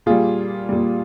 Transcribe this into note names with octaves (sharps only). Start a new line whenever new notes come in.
A#2 G3 F4 G#4
A#2 G3